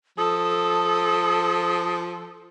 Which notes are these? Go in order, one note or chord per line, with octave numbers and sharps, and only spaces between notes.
F3 A4 D#6